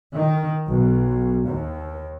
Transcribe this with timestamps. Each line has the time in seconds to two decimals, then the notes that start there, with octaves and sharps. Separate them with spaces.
0.15 D#3
0.66 B1
1.45 D#2